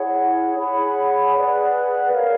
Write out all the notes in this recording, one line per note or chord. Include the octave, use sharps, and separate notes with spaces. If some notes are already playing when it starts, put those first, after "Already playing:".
Already playing: E4 G#4 C#5 F#5
G#4 C#5 F#5 B5
G#4 B4 D5 F#5
A#4 C#5 F5